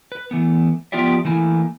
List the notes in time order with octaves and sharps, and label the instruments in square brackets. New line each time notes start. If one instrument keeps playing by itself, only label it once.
[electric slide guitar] B4
E3 A3 B3
F3 B3 F4 G4 D5 E5
E3 A3 A#3 E4 G#5